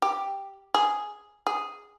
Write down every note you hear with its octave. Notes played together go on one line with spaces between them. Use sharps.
G4
G#4
G#4